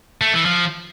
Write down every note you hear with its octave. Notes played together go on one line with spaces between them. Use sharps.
A3
E3
F3